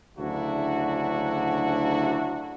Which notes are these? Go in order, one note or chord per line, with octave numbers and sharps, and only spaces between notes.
D2 C#3 F#3 D4 E4 F#4